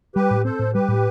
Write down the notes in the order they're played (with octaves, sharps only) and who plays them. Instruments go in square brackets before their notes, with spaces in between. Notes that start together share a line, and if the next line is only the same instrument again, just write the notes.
[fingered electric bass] G3 [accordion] G4 B4
[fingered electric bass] A2
[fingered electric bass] C4 [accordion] A4 C5
[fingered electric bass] A2
[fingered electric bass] G3 [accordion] G4 B4
[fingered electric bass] A2